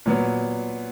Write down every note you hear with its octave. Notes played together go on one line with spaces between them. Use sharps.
A#2 F#3 B3